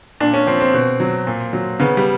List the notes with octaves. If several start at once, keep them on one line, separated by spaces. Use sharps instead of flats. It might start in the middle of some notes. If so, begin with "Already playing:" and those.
A#2 D4
C#4
F3 C4
C4
B2
F#3
A#2
F#3
C#3 B3
G3